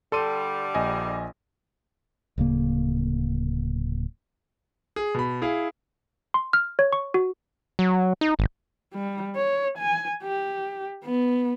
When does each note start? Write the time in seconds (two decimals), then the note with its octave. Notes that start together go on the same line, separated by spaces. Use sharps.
0.12 D3 G3 A4 C6 D#7
0.75 A#1 D#5 G#5
2.38 D1 C#3 A#3
4.96 G#4
5.15 B2 B5
5.42 E4 G#4 F5
6.34 C6
6.53 F6
6.79 C#5
6.93 C#6
7.14 F#4
7.79 F#3
8.21 D#4
8.39 G#1
8.94 G3
9.36 C#5
9.78 G#5
10.23 G4
11.04 B3